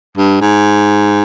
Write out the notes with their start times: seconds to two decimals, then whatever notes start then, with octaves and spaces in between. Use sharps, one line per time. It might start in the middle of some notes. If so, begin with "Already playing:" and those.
0.17 G2
0.41 G#2